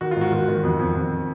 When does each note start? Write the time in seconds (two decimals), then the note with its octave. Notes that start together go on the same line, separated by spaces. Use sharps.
0.01 D#3 F#4
0.11 F4
0.16 G#2
0.21 F#4
0.32 D#3 F#4
0.48 D#3
0.63 F2
0.79 F2
0.96 F2